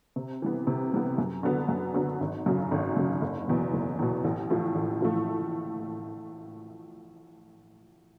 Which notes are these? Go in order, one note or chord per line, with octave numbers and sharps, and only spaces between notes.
C3
E3 G3 B3
C3
E3 G3 B3
F#2
D3 F#3 B3
F#2
D3 F#3 B3
G#1
F#2 C#3 F#3
G#1
F#2 C#3 F#3
F#1
E2 B2
F#1
E2 B2
A1
A2 F3 A3
A1
A2 F3 A3